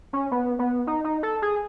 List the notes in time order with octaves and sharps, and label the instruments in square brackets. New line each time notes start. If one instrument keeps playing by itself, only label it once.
[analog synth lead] C#4
B3
B3
D#4
D#4
A4
G#4